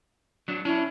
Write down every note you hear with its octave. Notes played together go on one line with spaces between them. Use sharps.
F#3 D4
C#4 D4 E4